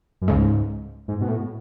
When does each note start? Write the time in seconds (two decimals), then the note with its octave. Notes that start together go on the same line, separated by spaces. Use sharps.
0.22 F#2
0.28 C#2 G#2 C#3 G#3
1.08 G#2
1.21 B2
1.28 A2